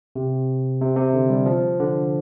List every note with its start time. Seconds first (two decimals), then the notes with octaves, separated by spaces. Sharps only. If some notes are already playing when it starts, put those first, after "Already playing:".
0.16 C3
0.81 C3
0.97 C3
1.14 D3
1.30 G3
1.46 F3
1.80 D3